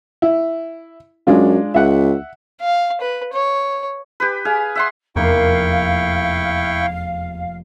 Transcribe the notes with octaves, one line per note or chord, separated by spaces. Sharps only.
E4
F#2 G#3 D4 F4
C#2 E5 F#5
F5
B4
C#5
G4 B4
G#4 F5
E5 F#5 C6
F1 E2 A#3 E4 F5 G5 C#6 F#6